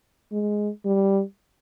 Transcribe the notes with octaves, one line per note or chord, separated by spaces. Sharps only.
G#3
G3